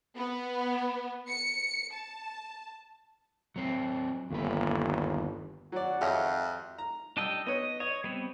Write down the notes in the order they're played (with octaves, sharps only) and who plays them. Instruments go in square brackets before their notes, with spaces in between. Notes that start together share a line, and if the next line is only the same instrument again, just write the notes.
[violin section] B3
C#7
A5
[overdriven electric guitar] F#3 C4
[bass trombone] G1 [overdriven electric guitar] D#2 B4
[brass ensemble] G#1 F#4 F#5 [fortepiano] F#3 D5
[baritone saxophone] F2 [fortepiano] G4 C#5 D#5 [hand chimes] E5
[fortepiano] A#5
[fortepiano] G3 A5 E6 [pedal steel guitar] D4 D#5 G5
[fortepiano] B3 C#5 [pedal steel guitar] D#5
[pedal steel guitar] C#5 [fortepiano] D#5
[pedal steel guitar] G3 B3 C4